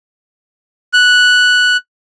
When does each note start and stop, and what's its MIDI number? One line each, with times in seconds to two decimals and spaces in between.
0.93 1.77 90